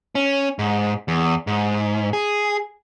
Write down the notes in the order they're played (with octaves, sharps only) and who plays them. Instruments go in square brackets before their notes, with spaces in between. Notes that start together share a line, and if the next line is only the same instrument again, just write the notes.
[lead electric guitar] C#4
G#2
E2
G#2
G#4